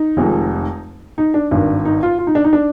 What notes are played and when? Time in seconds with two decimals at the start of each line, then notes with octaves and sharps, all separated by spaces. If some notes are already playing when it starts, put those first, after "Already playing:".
Already playing: D#4
0.17 F1 F2 D#3 G#3
1.18 D#4
1.34 D4
1.51 G#1 G2 D#3 D4
1.85 D#4
2.03 F4
2.18 F4
2.27 D#4
2.35 D4
2.44 D#4
2.53 D4